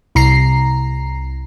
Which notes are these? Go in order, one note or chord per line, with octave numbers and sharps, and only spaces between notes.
C2 A#5 C7